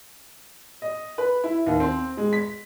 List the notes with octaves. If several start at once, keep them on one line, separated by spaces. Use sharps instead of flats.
D#5
B4
E4
D#2
C4
G#3
B6